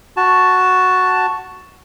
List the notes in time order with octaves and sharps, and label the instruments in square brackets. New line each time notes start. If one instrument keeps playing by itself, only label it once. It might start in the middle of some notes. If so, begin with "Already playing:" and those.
[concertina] F#4 A5